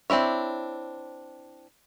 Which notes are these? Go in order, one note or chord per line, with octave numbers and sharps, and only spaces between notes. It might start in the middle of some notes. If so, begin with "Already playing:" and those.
C4 D4 E4 C#5